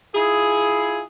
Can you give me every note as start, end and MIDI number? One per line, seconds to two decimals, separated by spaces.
0.14 1.02 64
0.14 1.02 65
0.14 1.02 68